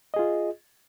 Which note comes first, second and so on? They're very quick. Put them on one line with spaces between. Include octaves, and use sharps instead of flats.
D#5 G#4 F4